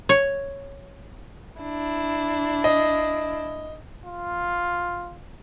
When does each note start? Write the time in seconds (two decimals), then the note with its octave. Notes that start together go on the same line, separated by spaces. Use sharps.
0.09 C#5
1.62 D4 E4
2.64 D#5
4.05 F4